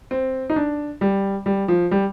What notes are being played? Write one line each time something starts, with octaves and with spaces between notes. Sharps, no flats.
C4
D#4
D4
G3
G3
F3
G3